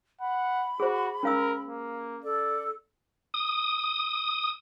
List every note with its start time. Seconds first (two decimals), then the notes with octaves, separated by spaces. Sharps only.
0.21 F#5 B5
0.80 F#4 G#4 C5
1.23 C#4 A#4 F5 E6
1.65 A#3
2.24 A4 D5
3.34 D#6